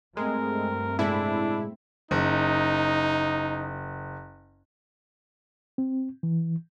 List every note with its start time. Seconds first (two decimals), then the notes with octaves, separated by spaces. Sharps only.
0.17 G2 G#3 A3 C4 A#4
0.99 A2 C3 G#3 D4 E4
2.11 F#1 D#4
5.78 C4
6.23 E3